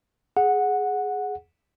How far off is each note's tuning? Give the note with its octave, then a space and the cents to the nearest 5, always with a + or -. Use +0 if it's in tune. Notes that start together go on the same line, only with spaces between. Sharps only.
G#4 +5 F#5 -10